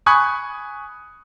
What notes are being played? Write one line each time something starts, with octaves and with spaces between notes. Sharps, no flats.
G#5 B5 C#6 D#6 F#6 G#6